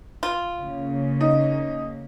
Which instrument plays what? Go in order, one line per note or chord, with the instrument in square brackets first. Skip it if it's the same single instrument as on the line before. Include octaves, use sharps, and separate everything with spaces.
[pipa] F4
[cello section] C#3 A#3
[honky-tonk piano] D#4